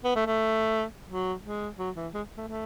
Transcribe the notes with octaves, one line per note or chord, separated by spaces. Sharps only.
B3
A3
A3
F#3
G#3
F#3
E3
G#3
A3
A3